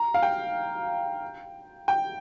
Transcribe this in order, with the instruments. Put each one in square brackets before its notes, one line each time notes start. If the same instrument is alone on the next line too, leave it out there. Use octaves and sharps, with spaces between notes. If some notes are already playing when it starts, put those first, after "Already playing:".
Already playing: [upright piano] A#5
F5
G5
G5